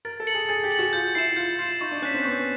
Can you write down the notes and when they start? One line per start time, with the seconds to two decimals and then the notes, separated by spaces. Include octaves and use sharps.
0.05 A#4 A6
0.20 A4
0.27 C#7 F#7
0.34 G#4
0.49 G#4 A6
0.64 G4
0.71 C#7 F#7
0.79 F#4
0.93 F4 G6
1.15 E4 C7
1.18 E7
1.36 F4 G6
1.59 F4 C7 E7
1.81 D#4 C#6
1.91 D4
2.02 C#4 F#6 B6 E7
2.14 C4
2.25 B3 C#6